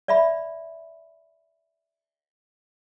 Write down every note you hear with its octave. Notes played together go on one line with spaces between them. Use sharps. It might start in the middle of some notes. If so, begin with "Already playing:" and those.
D5 E5 B5